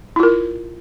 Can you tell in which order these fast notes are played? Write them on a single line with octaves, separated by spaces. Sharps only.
E4 F4 A#4